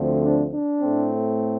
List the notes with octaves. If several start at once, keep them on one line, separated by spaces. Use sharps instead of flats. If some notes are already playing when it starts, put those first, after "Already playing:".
Already playing: D2 D3 F3 A3 C4
D4
D4
A2 A3 C4